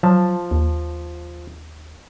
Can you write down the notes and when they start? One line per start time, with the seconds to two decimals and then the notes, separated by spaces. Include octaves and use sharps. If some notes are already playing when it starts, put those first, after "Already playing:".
0.03 F3 F#3 A5
0.51 D#2